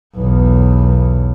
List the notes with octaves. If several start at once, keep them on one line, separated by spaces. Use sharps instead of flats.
B1 E2